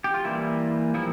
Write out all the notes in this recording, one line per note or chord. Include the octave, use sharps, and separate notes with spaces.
G4
F4
E3 G3 A#3 E4
F3 A#3 E4